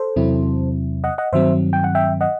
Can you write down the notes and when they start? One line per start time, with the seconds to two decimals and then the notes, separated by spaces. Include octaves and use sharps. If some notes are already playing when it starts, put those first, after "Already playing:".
Already playing: A4 C5
0.16 E2 C3 F#3 C4 E4
1.04 D#5 F#5
1.18 D#5 F#5
1.33 G2 D#3 F#3 C4 C5 E5
1.73 G5
1.84 F#5
1.95 E5 G5
2.21 D#5 F#5